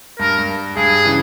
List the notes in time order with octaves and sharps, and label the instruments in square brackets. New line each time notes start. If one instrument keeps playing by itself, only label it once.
[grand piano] G2 [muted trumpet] A#4
[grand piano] G2
[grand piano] G2 [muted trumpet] G#4
[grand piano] C#3 E3